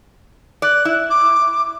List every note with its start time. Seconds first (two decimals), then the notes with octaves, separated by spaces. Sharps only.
0.62 D5 F#6
0.85 E4
1.10 D6